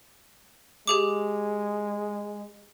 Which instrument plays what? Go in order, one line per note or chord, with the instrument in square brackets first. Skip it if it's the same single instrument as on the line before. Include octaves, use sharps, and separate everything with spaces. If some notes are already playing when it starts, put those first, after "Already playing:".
[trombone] G#3 [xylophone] G4 G#4 D6